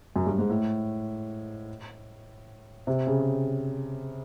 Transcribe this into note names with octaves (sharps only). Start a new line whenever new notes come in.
F#2
G2
G#2
A2
C3
C#3